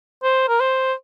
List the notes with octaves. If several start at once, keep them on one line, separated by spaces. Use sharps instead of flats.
C5
A#4
C5